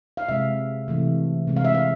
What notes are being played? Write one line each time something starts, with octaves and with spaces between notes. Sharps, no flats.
F5
C3 G#3 E5
C3 E3 A3
C3 G#3
F5
E5
F5